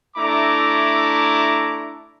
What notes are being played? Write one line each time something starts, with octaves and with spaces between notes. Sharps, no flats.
A3 D4 E4 A#5 D6